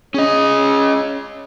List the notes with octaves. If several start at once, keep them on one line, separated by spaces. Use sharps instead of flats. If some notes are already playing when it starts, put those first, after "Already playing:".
C#4 G#4 C#5 D#5